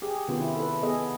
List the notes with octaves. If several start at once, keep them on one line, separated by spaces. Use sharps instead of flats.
G4 G#4
C3 D#3 B3 C#4 F4 G4
E4
A4 B4
B3 G#4 A4 D#5